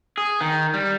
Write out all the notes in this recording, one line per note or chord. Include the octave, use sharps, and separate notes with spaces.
G#4
D#3
G3